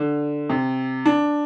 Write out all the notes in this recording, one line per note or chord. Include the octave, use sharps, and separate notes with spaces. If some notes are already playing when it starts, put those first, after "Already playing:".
Already playing: D3
C3
D4